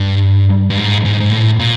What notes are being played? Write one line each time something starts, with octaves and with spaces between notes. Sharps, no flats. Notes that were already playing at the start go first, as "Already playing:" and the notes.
Already playing: G2
G2
G#2
G#2
G#2
A2
A#2